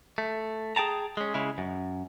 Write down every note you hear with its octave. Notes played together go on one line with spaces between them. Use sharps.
A3
G#4 G5 A5 A#5
G#3 C#4
C#3 G#3 E4
F#2